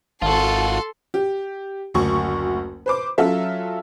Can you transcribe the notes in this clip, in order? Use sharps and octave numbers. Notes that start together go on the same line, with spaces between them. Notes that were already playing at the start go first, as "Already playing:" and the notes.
G#1 F4 F#4 A4 A5 C6
G4
F#1 D2 C#6
B4 C5 D6
F#3 C#4 F4 A4 E5